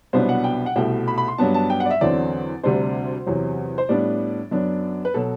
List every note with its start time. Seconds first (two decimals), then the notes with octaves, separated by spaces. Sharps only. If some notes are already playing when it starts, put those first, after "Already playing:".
0.13 C2 B2 F#3 B3 D4 C5
0.29 F#5
0.44 G5
0.66 F#5
0.76 C2 B2 A3 G5
1.08 B5
1.18 B5
1.28 C6
1.38 G2 F#3 B3 D4 A5
1.54 A5
1.70 G5
1.80 F#5
1.86 D5
1.91 E5
2.01 E2 D3 F#3 C4 D5
2.63 D2 C3 G3 D4 C5
3.26 E2 C3 F#3
3.78 C5
3.89 A2 G3 B3 D4 D5
4.51 F#2 F#3 B3 D4
5.05 B4
5.14 B2 F#3 A4